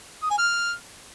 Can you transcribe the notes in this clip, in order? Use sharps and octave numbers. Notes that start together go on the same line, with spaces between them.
D#6
G#5
F6